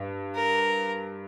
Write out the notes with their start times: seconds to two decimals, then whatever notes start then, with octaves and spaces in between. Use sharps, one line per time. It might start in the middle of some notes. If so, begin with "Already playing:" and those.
Already playing: G2
0.35 A#4